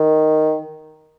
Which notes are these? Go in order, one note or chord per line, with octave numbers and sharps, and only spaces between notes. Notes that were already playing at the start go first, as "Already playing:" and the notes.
Already playing: D#3